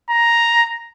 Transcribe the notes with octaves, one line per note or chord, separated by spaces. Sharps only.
A#5